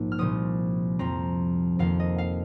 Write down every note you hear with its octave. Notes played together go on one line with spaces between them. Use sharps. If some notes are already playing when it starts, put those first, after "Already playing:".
Already playing: A#1 G#2 A#3
F6
C2 A#2 F3 D#6
F2 F3 C4 A#5
F2 D#3 A#3 F5
D#5
F5